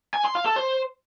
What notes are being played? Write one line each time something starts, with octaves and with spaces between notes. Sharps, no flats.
G#5
C6
F5
A4
C5